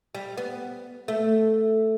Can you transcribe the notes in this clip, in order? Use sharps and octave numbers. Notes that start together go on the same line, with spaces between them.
G3
B3
A3